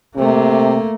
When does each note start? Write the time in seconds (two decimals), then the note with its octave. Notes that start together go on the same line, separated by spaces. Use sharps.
0.16 C3 A3 A#3